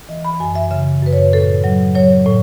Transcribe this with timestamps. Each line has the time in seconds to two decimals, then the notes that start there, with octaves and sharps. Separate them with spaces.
0.09 E3 D#5
0.25 B5
0.40 F#2 G#5
0.55 E5
0.71 C#3 E5
1.02 F#2 B4
1.13 C#5
1.33 A2 A4
1.64 F#3
1.95 F#3 C#5
2.26 A2